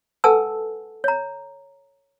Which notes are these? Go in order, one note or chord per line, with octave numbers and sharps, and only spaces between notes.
A4 B4 F#5 G#5 A5 E6
C#5 A#5